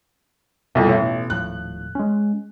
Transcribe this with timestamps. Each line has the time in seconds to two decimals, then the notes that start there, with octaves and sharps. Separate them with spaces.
0.75 C2 F2 B2
0.89 A1
1.30 D#1 A2 F3 F#6
1.95 G#3 C#4